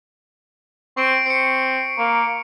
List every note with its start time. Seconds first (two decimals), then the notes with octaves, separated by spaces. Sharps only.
0.97 C4 C#6 D7
1.26 C4 C7 C#7
1.98 A#3